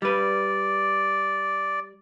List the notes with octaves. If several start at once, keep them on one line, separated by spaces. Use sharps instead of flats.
G3 B4 D5